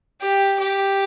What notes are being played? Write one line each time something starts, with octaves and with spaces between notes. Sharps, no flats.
G4
G4